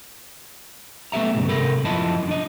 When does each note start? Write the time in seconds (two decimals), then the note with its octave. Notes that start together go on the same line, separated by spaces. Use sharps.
1.12 A3 B3 G4 E5 A#5
1.35 B1 G2 C#3
1.48 C3 A4 A#4 B5
1.85 F#2 F3 E4 D#5 A5 B5
2.28 D4 D#5